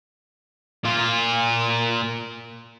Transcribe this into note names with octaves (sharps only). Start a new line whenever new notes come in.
A#2 F4